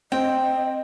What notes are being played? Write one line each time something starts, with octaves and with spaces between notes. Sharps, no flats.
C4 D#5 G5